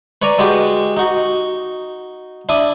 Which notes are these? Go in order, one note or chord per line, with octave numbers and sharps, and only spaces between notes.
B4 C#5 D5 G#5 A#5
G#3 F#4 G4 B4
D#4 F#4
D4 E4 D#6